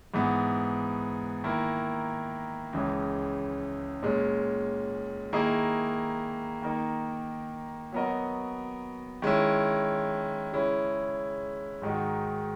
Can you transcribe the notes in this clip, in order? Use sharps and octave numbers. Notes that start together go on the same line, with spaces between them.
G#2 E3 B3
D#3 A#3 E4 A#4
C#2 C#3 E3 G#3 C#4
A#2 G#3 C#4
D#3 A#3 E4 G#4 D#5
D#3 A#3 D#4 A#4
F#3 B3 F#4 A#4 D#5
D#3 G#3 C#4 E4
C#3 G#3 C#4 E4
G#2 D#3 G#3 D#4 F#4